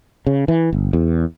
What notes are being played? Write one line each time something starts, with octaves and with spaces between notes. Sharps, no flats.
C#3
E3
G1
E2